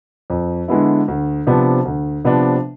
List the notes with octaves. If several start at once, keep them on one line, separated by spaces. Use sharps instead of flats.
F2
D3 G#3 B3 E4
D2
C3 F3 B3 D4
D2
C3 F3 B3 D4